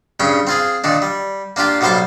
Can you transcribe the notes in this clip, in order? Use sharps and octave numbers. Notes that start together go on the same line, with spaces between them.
G2 C#3 C#4 G5
C4 F4 G#4
A#2 D#3 D4
G3
A#3 D4 F4 G4
B1 G3 A#3 G4 C5 A5